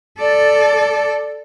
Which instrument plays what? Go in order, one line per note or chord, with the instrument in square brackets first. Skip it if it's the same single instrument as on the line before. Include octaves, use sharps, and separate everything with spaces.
[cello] A4 D5